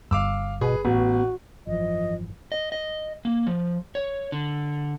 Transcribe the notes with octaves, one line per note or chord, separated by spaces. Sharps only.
G1 G2 F5 D6 E6
B2 G#4 B4
A1 B3 F#4
G#1 F#2 E3 F3 D#5
D#5
D#5
A#3
F3
C#5
D3